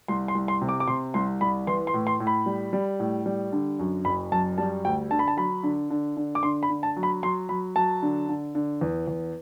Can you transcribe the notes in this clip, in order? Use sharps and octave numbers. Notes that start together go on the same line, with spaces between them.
C2 C6
C6
C2
C6
C3
D6
D6
C3 C6
C2 C6
C2 B5
E3 C6
C6
A2
C6
A2
B5
G3
G3
A2
G3
D3
F#2
F#1 B5
F#2 A5
G3 A5
D2 G5
D3 A5
B5
A5
F#3 B5
D3
D3
D3
D6
D3 C6
B5
D3
A5
F#3
B5
F#3 C6
F#3 B5
F#3 A5
D3
D3
D3
E2
E2